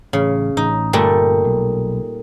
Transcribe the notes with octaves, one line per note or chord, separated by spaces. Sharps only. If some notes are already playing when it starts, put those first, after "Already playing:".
A1 C#3
A1 D#4
G1 A#2 G3 A3
B1